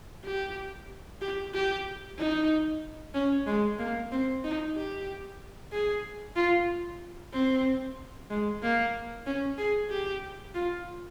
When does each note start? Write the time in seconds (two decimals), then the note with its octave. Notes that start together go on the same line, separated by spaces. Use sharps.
0.25 G4
1.22 G4
1.54 G4
2.19 D#4
3.14 C#4
3.47 G#3
3.79 A#3
4.12 C4
4.44 D#4
4.76 G4
5.73 G#4
6.36 F4
7.33 C4
8.30 G#3
8.63 A#3
9.26 C#4
9.58 G#4
9.91 G4
10.55 F4